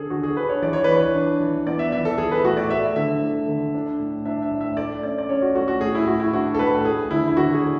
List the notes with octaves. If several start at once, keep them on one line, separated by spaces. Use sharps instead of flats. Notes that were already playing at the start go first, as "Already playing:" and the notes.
Already playing: D3 D4 G#4 A4
D3 F#4
G#4
D4 B4
C#5
E3 D5
C#5
E3 B4
C#5
D4
E3
B3 D5
E5
E3 E5
A4
E3 G#4
B4
A2 F#4
D5
A3 E5
D3 E5
A3
D3
D4
A2
D4 E5
E5
A2
E5
A3 D5
C#4 D5
D5
C#4 C#5
F#4
A3 F#4
F#4
A2 G#4
E4
A2 F#4
E4
D4 F#4
A4
A2 B4
A3 G#4
D3 E4
E4
D3 F#4
G#4
D3